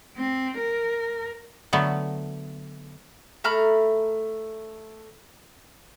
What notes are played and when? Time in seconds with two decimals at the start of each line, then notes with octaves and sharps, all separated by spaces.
0.17 C4
0.57 A#4
1.73 D3 F#3 A3 B3
3.44 A3 A#5 B5 F6